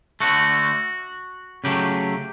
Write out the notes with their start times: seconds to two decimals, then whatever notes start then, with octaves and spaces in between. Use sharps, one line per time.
0.20 D3 A3 F#4
1.64 C#3 F#3 A3 G4